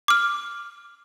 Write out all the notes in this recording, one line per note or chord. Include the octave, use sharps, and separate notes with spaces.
D6 F6